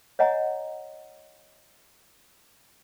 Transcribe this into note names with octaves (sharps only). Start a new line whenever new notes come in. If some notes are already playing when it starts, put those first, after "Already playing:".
C#5 D#5 F#5 G#5 A#5